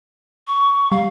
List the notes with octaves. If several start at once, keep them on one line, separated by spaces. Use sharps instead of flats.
C#6
G3 F5